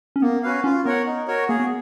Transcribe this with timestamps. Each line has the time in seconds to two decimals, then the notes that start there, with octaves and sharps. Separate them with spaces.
0.16 C#4
0.22 A#3 B3
0.43 C#4 F#4 B4 F5
0.64 C#4 F4
0.85 B3 A#4 C#5 F#5
1.06 D#4
1.28 F#4 A#4 C#5
1.49 A#3 G#4
1.60 B3